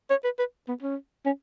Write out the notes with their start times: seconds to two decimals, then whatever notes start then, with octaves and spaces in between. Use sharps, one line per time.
0.10 C#5
0.24 B4
0.39 B4
0.69 B3
0.83 C#4
1.26 C#4